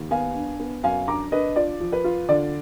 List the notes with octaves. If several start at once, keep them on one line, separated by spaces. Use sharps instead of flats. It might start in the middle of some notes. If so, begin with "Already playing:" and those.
Already playing: D#2
B3 F5 G#5
D4
B3
F#2 F5 G#5
D4 A#5 D6
D4 B4 D#5
F4 D5
F3
B4
F4
D3 D5